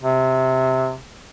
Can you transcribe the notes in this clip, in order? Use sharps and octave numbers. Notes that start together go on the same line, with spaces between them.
C3